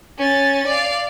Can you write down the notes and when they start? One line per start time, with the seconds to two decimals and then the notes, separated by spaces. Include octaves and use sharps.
0.18 C#4 A6
0.68 D5 F5